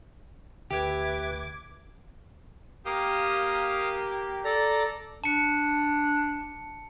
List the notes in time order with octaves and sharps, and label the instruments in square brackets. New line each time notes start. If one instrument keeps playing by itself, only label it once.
[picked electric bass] D2 [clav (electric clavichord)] G4 [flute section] B4 E5 [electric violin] D6 G#6
[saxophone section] A#3 G4 [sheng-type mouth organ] F5 D#6
[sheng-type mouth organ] A4 D5 A#5
[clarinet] D4 [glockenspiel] A5 C#7